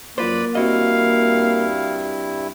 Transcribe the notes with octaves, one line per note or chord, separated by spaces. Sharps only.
F#2 A#3 F4 B4 C5 D5 B5
G2 C4 E4 F#4 D#5 F5